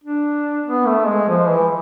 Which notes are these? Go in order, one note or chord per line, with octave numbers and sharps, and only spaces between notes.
D4
B3
A3
G#3
F3
E3